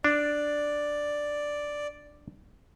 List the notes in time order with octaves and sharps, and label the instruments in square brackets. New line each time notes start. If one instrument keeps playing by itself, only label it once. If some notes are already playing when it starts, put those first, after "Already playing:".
[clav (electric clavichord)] D4 [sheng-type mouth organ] D5